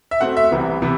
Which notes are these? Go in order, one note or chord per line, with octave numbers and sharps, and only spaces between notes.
E5
B2 A3 C4 F#5
E5
C2 C3 E3 B3
C3 E3 B3